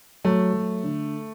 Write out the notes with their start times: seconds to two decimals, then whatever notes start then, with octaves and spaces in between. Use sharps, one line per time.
0.25 F#3 A3
0.54 F#3
0.83 D3